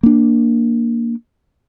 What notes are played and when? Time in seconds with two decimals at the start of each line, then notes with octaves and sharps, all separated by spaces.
0.03 A#3 D4